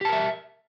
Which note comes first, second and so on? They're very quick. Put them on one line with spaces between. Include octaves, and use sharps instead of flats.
G4 A5 A#4 E5